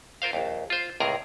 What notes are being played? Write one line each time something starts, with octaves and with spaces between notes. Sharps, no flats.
F4 A#4 C5 F5
A#1 D#2
F4 C5
C#2 A2 C3 G#4 A#4 A#5